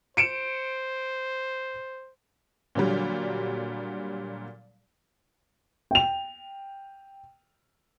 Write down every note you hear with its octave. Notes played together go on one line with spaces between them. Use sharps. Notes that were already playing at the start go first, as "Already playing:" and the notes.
C5 C#7 D7 E7
A#2 D3 F#3 G3
G5 F7